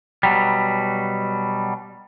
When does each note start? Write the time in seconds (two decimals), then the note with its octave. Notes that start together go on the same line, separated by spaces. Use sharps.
0.23 B2 F#3 G3